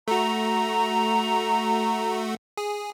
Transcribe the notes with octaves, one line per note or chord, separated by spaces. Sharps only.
A3 F#4 A#5
G#4